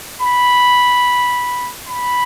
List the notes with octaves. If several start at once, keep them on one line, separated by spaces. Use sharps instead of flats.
B5
B5